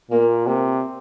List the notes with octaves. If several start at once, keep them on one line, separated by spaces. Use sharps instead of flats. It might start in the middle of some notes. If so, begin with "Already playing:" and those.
A#2 A#3
C3 A#3